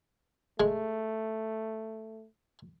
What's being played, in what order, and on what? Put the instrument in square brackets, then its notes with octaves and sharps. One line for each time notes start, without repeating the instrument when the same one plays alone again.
[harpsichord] G#3 [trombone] A3